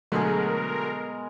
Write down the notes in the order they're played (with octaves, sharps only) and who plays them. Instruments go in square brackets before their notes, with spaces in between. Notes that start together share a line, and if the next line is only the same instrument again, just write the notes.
[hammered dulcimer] B2 G#3 G#4 [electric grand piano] D3 F#3 A3 [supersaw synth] A#4